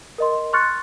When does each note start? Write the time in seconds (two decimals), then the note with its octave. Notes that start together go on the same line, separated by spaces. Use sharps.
0.18 A#4 D#5 C6
0.53 C6 C#6 F6 F#6 A6 C#7